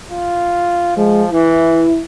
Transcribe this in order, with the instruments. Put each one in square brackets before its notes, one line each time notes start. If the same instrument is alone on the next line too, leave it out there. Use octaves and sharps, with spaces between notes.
[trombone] F4
[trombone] F3 [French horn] G#3
[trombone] E3 [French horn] E4